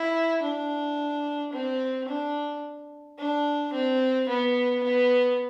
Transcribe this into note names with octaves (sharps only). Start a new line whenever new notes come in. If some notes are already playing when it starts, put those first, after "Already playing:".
Already playing: E4
D4
C4
D4
D4
C4
B3
B3